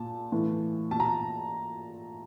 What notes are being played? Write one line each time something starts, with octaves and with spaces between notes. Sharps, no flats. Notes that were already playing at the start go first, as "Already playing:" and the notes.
Already playing: A#2 A5
A2 E3
A#2 A5
A#5